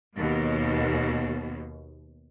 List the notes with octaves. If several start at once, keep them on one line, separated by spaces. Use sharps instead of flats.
D#2 B2